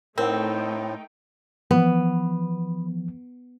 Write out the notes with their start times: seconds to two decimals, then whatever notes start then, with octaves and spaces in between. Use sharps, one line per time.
0.18 A2 A3 C4 D#4 A#4 F#5 G5
1.71 E3 F3 B3